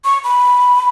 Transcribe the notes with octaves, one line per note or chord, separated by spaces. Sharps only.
C#6
B5